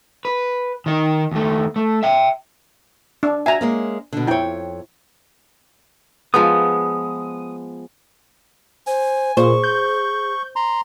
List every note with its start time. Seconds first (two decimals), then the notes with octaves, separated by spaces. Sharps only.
0.25 B4
0.86 D#3 D#4
1.32 D#2 A3
1.76 A3
2.03 E5 G5
3.23 D4
3.46 F#4 E5 G#5 A#5
3.61 G#3 A#3 C#4
4.13 B2 D3
4.27 F2 E4 C#5 G5
6.34 F3 G#3 B3 D#6
8.87 C5 G#5
9.37 A#2 G#4 C5 C#6
9.64 G6
10.56 A#5 C6